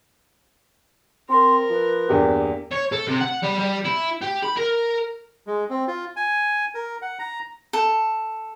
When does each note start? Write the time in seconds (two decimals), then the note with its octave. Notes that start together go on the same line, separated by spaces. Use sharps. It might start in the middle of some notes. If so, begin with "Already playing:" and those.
1.29 C4 A#4 C6
1.70 F3 B4
2.09 E2 G2 A#3 G4
2.72 C#5
2.92 A4
3.07 C3
3.20 F#5
3.42 G3
3.58 G3
3.85 E4
4.21 G4
4.43 B5
4.56 A#4
5.47 G#3
5.70 C4
5.88 F4
6.16 G#5
6.74 A#4
7.02 F#5
7.19 A#5
7.73 A4